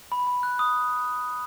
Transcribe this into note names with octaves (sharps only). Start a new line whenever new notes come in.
B5
B5
F#6
D#6